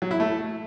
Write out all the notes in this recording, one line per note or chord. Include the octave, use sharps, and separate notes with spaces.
F#3
E4
A3